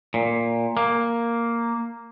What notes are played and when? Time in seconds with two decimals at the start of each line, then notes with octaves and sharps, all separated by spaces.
0.14 A#2
0.77 A#3